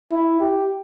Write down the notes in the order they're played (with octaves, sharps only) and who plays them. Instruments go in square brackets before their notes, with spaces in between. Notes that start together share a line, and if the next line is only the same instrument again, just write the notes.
[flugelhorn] E4
G4